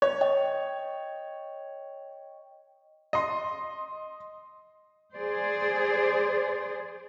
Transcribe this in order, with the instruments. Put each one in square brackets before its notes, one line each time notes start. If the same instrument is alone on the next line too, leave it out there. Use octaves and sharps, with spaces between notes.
[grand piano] C#5
[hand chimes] D#5 G5
[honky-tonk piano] D#5 C6
[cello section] G#4 C5 D5